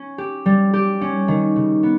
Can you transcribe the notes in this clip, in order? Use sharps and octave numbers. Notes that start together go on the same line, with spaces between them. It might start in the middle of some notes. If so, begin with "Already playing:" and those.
Already playing: C#4
G4
G3
G4
C#4
D#3
C#3
B3